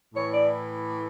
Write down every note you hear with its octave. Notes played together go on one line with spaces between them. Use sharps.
A2 E3 C#5
D5